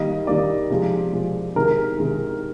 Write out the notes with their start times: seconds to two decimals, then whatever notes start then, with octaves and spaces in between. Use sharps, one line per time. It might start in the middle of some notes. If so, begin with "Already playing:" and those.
Already playing: D#3 G3 A#3 D#5
0.27 D#3 G3 A#3 D5
0.70 C3 F3 G#3
1.13 C3 F3 G#3
1.56 C3 D#3 G#3 A#4
1.98 C3 D#3 G#3